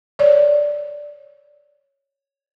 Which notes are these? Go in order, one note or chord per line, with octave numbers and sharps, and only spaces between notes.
C#5 D5